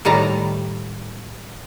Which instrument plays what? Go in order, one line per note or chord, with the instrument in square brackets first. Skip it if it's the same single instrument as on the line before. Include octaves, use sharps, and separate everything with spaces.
[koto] A2 D#3 G3 A5 A#5